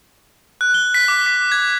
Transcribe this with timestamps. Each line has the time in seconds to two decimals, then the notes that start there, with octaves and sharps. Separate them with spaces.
0.61 F#6
0.74 G7
0.94 B6
1.08 D6
1.26 B6
1.52 G#6